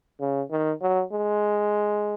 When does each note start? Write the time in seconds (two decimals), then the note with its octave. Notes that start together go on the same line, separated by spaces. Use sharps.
0.21 C#3
0.51 D#3
0.82 F#3
1.12 G#3